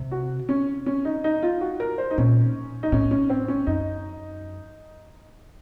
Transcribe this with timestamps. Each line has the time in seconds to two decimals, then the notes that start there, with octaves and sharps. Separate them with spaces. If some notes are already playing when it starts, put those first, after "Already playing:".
Already playing: C3
0.11 F#4
0.49 C#4
0.86 C#4
1.05 D#4
1.24 D#4
1.43 F4
1.61 F#4
1.80 A#4
1.98 C5
2.11 D#4
2.18 A#2 C#4
2.83 D#4
2.92 A2 C#4
3.11 C#4
3.30 C4
3.48 C#4
3.67 F#2 D#4